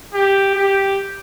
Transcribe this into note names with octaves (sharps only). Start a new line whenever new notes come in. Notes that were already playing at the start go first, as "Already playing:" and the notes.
G4
G4